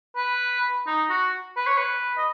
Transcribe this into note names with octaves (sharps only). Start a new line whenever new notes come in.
B4
D#4
F#4
B4
C#5
B4
D#5